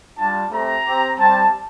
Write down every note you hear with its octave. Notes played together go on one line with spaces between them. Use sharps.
G3 D4 F4 A5
A3 C4 G4 A#5
C4 G4
G3 C4 G4 A5